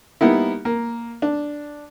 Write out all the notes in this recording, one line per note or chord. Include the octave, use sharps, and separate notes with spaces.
G3 A#3 B3 D#4 E4
A#3
D4